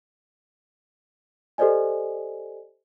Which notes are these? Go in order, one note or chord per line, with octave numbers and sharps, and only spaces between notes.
G4 A4 C5 D5 D#5 G#5